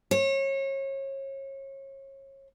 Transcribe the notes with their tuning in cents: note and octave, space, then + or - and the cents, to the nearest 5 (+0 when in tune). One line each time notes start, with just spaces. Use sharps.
C#5 -30